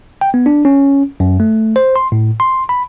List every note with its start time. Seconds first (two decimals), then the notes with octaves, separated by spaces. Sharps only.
0.21 G5
0.34 B3
0.46 D4
0.65 C#4
1.20 F#2
1.40 A3
1.76 C5
1.96 C6
2.12 A2
2.40 C6
2.69 B5